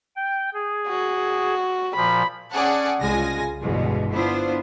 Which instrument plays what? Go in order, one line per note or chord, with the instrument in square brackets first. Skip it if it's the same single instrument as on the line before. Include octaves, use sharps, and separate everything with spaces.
[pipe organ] G5
G#4
[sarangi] F#4
[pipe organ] A#2 F3 [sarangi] B5
[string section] C#4 G#4 D5 F#5 A5
C2 C#3 G#3 F4 G#5 A#6
G1 E2 G2 B2 G#3
B3 D4 E4 F4 C5